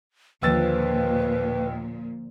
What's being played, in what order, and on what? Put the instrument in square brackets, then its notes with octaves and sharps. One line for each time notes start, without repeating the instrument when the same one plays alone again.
[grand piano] D#2 E6 A6 [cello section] A#2 [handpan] D3 F3 [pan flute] B4